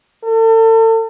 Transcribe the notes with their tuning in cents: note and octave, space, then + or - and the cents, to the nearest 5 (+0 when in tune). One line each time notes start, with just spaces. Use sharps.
A4 +35